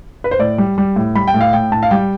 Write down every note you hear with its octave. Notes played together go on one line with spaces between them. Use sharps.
B4
C5
A2 D5
G3
G3
A2
G3 B5
G5
A2
F5
A2 G5
A2 A5
F5
G3 G5